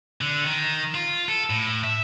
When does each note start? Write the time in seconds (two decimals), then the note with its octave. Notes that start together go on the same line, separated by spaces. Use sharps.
0.21 D3
0.46 D#3
0.95 F4
1.28 A4
1.50 A2
1.84 E5